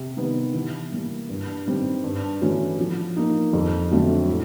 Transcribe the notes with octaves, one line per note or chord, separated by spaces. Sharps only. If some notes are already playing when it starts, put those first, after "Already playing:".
Already playing: C3
D#3 G3 B3
E3
G3 A#3
G2
D#3 G3 C4
G2
E3 A3 C#4 F#4
F3
A#3 D#4
F2
D3 F#3 A3 C4
A2